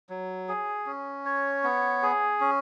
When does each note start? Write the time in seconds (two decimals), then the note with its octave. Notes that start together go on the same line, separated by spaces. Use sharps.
0.09 F#3
0.48 G#4
0.86 C#4
1.25 C#5
1.64 B3
2.02 G#4
2.41 C#4